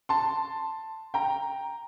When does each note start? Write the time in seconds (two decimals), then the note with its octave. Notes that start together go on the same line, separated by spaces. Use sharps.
0.09 A5 C6
1.14 G5 A#5